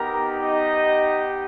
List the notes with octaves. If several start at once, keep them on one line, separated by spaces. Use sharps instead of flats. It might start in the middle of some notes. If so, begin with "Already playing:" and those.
Already playing: B3 D#4 G4 A#4 A#5
D#4 D#5